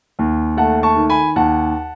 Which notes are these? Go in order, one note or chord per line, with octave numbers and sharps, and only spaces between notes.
D#2
A3 F#5 A5
A5 C#6
D#3
G#5 B5
D#2 F#5 A5